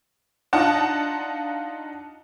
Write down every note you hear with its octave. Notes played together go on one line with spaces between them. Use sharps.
D4 D#4 F4 D#5 F#5 A5